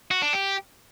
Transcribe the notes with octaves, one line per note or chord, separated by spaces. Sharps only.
F#4
D4
G4